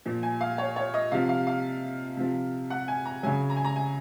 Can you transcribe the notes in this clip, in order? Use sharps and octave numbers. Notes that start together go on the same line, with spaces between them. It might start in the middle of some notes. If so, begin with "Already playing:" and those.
A#2 F3
G#5
F5
C#5
C#5
D#5
C3 F3 F5
F5
F5
C3 F3
F#5
G#5
A#5
C#3 F#3 G#5
A#5
G#5
A#5
G#5